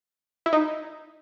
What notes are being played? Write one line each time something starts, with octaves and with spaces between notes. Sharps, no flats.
E4
D#4